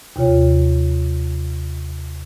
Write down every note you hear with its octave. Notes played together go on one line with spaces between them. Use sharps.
D#2 C3 F4 C#5